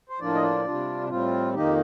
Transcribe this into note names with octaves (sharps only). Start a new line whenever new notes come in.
C5
A2 F3 A#3 D4 F4 D5
D#5
D5
C3 G3 D4 F4
A2 G3 C4 F4
F2 D#3 A#3 D#4 G4